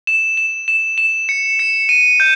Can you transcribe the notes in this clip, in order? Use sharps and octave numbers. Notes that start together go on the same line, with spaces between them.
E7
E7
E7
E7
C#7
C#7
D#7
G6